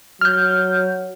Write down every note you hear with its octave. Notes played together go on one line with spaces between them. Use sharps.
F#3 F6 G6